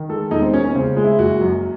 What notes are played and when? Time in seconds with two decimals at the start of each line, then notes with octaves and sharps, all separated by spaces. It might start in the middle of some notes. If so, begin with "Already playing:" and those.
Already playing: D#3
0.09 G#3 A4
0.31 E1 D#4
0.42 C4
0.53 D#2 C#4
0.64 C#4
0.75 C#3 C4
0.97 G#3
1.04 E4
1.19 F#1 F#4
1.41 F#2